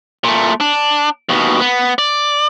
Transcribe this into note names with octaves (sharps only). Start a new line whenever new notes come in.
A#2 A3
D4
D#2 B2
B3
D5